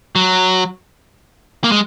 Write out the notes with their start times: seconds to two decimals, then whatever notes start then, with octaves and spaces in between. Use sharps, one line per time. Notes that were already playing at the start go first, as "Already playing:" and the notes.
0.16 F#3
1.64 A#3
1.72 G#3